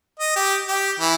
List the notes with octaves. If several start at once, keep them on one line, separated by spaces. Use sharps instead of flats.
D#5
G4
G4
E3